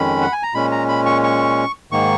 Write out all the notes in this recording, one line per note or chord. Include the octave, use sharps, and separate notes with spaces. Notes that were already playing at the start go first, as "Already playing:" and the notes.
Already playing: F2 D#3 G#3 C#4 B5
F#5
G#5
A#5
A#2 G#3 C#4 B5
A#5
B5
C#6
C#6
G#2 D#3 A#3 C#6